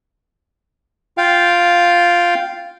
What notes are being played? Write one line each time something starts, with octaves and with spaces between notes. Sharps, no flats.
F4 F5 G5